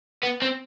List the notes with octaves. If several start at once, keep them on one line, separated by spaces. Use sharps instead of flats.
B3
C4